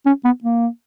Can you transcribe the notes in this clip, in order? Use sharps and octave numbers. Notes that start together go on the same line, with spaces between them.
C#4
B3
A#3